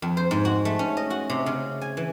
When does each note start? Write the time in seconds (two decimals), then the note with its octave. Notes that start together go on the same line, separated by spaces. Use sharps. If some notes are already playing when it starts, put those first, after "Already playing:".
0.02 F2
0.17 C5
0.31 G#2
0.45 F#4
0.65 A3
0.79 C#4
0.97 D#5
1.10 F#4
1.30 C3
1.46 C#3
1.81 G#5
1.97 E3